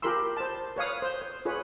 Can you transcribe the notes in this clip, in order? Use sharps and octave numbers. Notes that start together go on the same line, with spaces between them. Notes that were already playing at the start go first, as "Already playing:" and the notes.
F4 G4 A#4 B5 C6 E6
C5 A5
B4 C#5 F5 D#6
C5
C5
F4 G#4 B4 C#5